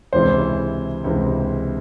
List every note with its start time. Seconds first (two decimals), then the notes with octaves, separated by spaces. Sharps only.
0.13 C#2 C3 E3 C5
1.04 C#2 C3 E3